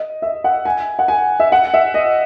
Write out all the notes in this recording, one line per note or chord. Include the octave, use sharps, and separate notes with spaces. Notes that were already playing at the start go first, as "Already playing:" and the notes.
Already playing: D#5
E5
F#5
G#5
F#5
G#5
E5
F#5
E5
D#5